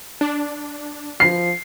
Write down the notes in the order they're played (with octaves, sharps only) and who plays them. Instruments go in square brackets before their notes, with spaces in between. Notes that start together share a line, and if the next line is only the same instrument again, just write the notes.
[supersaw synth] D4
[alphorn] F3 [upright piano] C7